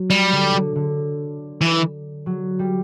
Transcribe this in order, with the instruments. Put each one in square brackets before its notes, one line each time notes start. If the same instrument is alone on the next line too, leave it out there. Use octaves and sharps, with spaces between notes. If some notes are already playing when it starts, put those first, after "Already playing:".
Already playing: [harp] F#3
[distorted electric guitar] G3
[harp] D3
D3
D3
[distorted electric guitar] E3
[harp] F#3
G3